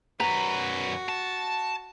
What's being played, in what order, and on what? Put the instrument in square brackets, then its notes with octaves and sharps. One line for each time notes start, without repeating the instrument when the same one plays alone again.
[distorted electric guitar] F#2 B4 [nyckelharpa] F#4 [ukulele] A#5
[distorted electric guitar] A5